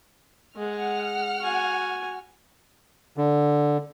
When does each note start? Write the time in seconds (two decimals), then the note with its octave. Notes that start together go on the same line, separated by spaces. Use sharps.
0.56 G#3 F#5 F6
1.41 F#4 G#5
3.18 D3